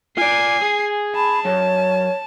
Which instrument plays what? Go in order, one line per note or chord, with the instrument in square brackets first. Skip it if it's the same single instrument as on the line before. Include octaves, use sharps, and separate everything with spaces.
[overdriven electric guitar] F4 D5 [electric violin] G#5 C7
[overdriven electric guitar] G#4
[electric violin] A5 [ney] B5
[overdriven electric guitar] F#2 [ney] C#5